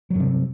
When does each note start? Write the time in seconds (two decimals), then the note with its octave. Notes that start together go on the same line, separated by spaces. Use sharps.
0.10 F#3
0.15 G2
0.20 C3